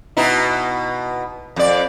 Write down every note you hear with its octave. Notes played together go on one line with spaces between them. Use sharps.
B2 D#4 E4
F2 D5